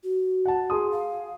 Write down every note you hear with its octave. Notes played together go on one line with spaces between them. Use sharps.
F#4
F#5 A5
G#4 C6 D#6
F5